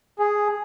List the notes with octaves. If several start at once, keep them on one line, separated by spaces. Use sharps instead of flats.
G#4